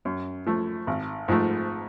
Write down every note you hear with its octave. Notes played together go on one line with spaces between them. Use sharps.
F#2
F3 A3
G#1
G#2 F3 A3